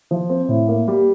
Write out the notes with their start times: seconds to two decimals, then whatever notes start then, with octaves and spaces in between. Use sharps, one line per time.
0.11 F3
0.29 C4
0.49 A2
0.68 A#3
0.88 G3